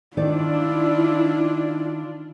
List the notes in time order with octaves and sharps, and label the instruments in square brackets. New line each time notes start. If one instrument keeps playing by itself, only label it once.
[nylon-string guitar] D#3 D5 [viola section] D4 F4 [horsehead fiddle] E4